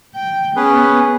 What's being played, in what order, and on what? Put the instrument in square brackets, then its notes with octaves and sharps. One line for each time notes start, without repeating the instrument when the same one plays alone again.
[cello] G5
[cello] B3 [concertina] C#4 G#4 B4